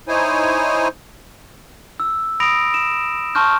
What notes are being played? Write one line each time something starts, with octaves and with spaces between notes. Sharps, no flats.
D#4 E4 C5 C#5 G#5
E6
B5 D#6 A#6 D7 F7
E7
A5 C6 C#6 F6 G6